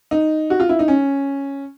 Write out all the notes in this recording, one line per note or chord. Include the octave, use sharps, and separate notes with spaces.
D#4
F#4
F4
E4
D#4
C#4